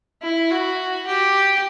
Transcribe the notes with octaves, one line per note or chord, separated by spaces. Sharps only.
E4
F#4
G4